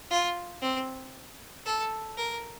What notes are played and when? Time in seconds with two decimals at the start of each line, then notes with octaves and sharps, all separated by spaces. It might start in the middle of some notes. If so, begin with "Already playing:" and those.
0.10 F4
0.62 C4
1.65 A4
2.17 A#4